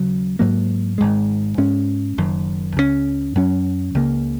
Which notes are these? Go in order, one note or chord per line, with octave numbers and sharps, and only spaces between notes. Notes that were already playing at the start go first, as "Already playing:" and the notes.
Already playing: D#2 C#3 F#3
G#2 F#3 A#3
G#1 G#2 G#3
G#2 G#3 C#4
F#1 F#2 D#3
C#2 C#3 G#3 C#4
F#2 F#3 C#4
C#2 C#3 A#3